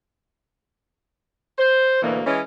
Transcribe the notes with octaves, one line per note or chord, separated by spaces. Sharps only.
C5
D2 B2 E3 A#3
E3 G#3 C#4